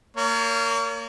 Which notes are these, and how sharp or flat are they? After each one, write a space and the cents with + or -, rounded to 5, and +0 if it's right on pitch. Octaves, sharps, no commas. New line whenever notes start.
A#3 -20 C#5 +35